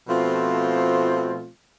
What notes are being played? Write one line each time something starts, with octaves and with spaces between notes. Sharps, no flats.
B2 F3 A3 C4 F4